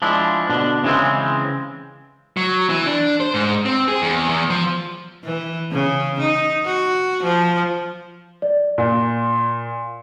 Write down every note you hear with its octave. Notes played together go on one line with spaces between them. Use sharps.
F3 G#3 D4 E4
B2 D3 D4
C#3 E3 G#3 C4
F#3
E3
D4
C5
G#2
C4
G#4
E2
E2
F3
E3
C#3
D#4
F#4
F3
D5
A#2